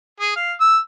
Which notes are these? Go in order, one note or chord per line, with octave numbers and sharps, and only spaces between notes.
G#4
F5
E6